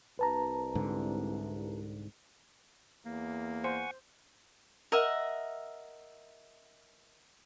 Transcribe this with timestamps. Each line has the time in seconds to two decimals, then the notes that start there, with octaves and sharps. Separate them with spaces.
0.19 C2 B4 A5 A#5
0.75 G#2 D3
3.06 E2 A#3
3.64 C5 F#5 G#5 C#6
4.92 A#4 D#5 E5 F#5